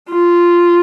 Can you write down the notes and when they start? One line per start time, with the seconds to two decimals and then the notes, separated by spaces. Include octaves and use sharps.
0.09 F4